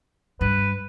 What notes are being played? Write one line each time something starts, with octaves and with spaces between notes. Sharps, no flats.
G2 B4